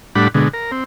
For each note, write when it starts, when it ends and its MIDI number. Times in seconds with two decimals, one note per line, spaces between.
0.15 0.28 45
0.15 0.28 55
0.15 0.28 62
0.15 0.28 78
0.15 0.28 83
0.35 0.48 47
0.35 0.48 50
0.35 0.48 56
0.54 0.71 70
0.72 0.84 60